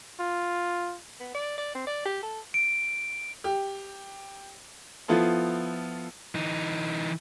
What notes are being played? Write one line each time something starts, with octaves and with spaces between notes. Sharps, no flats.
F4
B3
D5
D5
C4
D5
G4
A4
D7
G4
F3 B3 E4 F4 A4
E3 D#4